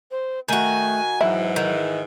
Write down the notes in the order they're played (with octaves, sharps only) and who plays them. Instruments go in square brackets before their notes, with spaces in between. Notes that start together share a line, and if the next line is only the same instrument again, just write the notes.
[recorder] C5
[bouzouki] D#3 F#4 [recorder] A3 [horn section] G#5
[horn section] G#2 E3 [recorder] F#3 [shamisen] E4
[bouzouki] D#3